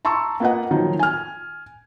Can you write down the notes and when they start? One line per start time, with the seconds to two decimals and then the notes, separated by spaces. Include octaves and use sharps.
0.05 A5 A#5 C6 C#6 E6
0.40 A#3 F4 B4 D#5 F#5
0.71 D#3 F3 F#3 D#4
0.99 G#5 F6